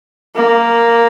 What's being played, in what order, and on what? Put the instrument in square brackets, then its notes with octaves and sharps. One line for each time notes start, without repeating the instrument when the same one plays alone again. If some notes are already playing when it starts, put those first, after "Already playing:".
[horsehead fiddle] A#3